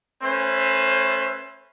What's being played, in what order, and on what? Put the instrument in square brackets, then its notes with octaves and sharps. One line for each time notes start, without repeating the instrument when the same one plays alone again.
[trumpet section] A3 C#4 B4 C5